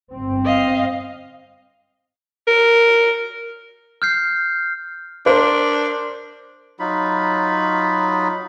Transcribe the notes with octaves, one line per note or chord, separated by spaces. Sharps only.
G1 C4
D#5 F5
A#4
F6 G6 C7
D4 A#4 C5
F#3 D#4 F4 B5